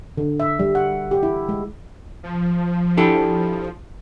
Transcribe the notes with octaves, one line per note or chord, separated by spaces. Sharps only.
D3
E5
G3
F#5
G4
E4
G#3
F3
D4 E4 G4 A4